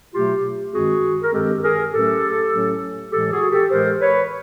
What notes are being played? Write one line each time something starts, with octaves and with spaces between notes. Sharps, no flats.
B2 F#3 A3 F4 G4
G2 D#3 G#3 C4 F#4 G#4
A#4
G2 D#3 G#3 C4 G4 A4
G#4 A#4
A2 F#3 A3 C#4 G4 A4
A2 F#3 A3 C#4
A2 E3 G#3 G4 A4
F#4 G#4
G4 A4
A2 E3 G#3 A#4 C5
B4 C#5